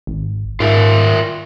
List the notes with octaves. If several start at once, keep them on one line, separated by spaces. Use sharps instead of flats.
G#1
G#2 F4 A#4 E5